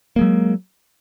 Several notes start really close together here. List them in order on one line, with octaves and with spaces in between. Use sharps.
A#3 G#3 F#3